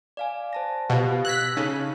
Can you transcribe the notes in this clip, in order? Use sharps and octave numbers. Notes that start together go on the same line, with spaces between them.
D5 F5 G#5
C5 A5 A#6
B2 F4 G4 F5
E6 F#6 G#6 A#6 B6
C#3 D#4 A4